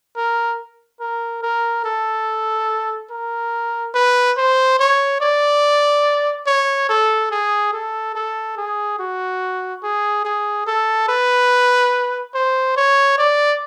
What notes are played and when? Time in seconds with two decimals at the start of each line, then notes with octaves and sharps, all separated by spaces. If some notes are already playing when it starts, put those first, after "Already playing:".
0.16 A#4
1.00 A#4
1.43 A#4
1.84 A4
3.10 A#4
3.94 B4
4.37 C5
4.79 C#5
5.21 D5
6.47 C#5
6.89 A4
7.31 G#4
7.73 A4
8.15 A4
8.57 G#4
8.99 F#4
9.83 G#4
10.25 G#4
10.67 A4
11.08 B4
12.35 C5
12.77 C#5
13.18 D5